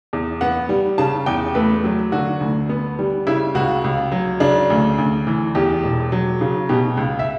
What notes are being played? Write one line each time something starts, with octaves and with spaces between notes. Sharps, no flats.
E2
B3 F#5
G3
C#3 A5
E2 G5
A3 B4
F#3
D3 F#4
D2
B3
G3
C#3 E4
C#2 F#4
C#2
F#3
C#3 D4
D2
D2
E3
E2 G4
E1
F#3
C#3
B2 G4
C#2
E5